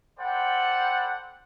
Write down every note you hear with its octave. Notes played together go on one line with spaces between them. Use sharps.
A4 C5 D5 F#5 G5 B5